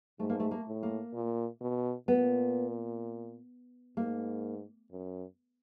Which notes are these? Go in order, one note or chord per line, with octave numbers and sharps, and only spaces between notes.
G#2 A3
A#3
A3
A#3
A2
A#3
A#2
B2
A#2 B3
G#2 A#3
F#2